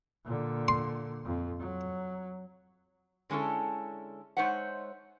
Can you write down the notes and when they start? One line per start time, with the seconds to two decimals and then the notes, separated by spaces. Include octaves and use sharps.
0.25 A#2 D3
0.68 C6
1.25 F2
1.60 F#3
3.30 D3 G#3 C#4 E4 A4
4.37 G#3 D#4 C5 C#5 E5 F#5